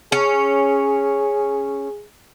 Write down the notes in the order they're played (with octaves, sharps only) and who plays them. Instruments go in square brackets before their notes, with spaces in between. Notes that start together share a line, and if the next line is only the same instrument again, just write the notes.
[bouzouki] C#4 [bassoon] G#4